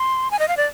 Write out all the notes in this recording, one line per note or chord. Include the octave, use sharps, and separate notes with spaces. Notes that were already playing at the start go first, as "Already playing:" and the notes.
Already playing: C6
G#5
D#5
F5
D5